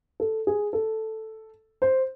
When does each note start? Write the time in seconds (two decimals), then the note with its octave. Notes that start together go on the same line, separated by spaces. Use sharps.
0.20 A4
0.47 G#4
0.73 A4
1.82 C5